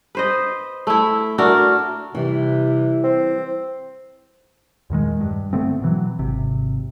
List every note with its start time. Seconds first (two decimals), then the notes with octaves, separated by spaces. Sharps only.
0.15 B4 C5 D#5
0.87 A3 E4
1.38 A3 D4 F#4 A#4
2.15 C3 E3 G3
3.03 C4
4.90 E2 A#2 D#3 G#3
5.21 G2
5.53 D3 A3 B3 C4
5.82 B2 E3 F#3
6.19 G#1 C3